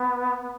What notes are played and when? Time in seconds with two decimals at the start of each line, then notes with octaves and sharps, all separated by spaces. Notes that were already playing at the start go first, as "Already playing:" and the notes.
Already playing: B3
0.41 B3